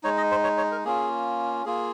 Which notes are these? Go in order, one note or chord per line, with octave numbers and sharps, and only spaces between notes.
G#3 D#4 C#5
D#5
C5
C#5
C#5
A#4
A#3 C#4 F4 G#4
A#3 F4 G#4